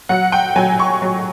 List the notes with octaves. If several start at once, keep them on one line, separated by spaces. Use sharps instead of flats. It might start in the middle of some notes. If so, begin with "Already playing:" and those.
F#3 F#5
G5
F#3 G#5
C#6
F#3